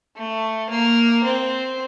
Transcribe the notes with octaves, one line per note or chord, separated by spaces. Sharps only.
A3
A#3
C4